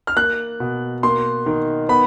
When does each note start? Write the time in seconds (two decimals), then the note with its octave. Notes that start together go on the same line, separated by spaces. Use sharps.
0.07 F6
0.17 A#3 F#6
0.60 B2
1.03 A#3 C6
1.46 D#3
1.89 B3 B5